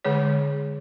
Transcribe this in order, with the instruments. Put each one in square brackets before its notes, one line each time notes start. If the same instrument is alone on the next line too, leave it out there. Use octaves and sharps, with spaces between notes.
[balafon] D3 G#3 G#4 C#5